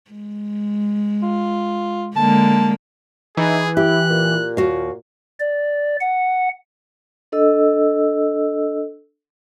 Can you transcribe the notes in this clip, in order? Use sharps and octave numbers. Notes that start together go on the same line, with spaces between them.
G#3
F4
D3 G#3 A#3 A5
E3 D#4 G#4
E4 G4 F#6
A#2
D#2 F#4 F5
D5
F#5
D4 A4 D#5 E6